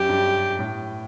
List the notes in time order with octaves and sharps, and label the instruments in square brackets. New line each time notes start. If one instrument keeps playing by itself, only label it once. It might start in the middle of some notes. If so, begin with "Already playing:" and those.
Already playing: [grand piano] F#2 [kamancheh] G4
[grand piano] G2
A2